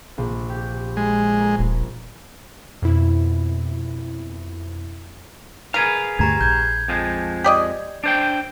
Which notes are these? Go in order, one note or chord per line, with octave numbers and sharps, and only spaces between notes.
A#1
G4
G#3
A#4
D#1
F2 B2 E4
G#4 A#4 B4 F5
D2 G2 A3 G4 A#5 G#6
A#1 G6 G#6
F2 F3 G#3
G4 D5 D#5
D4 C5 G5